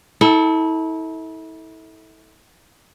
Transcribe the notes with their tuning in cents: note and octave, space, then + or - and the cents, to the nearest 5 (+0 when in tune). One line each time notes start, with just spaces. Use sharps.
E4 -35 A4 +0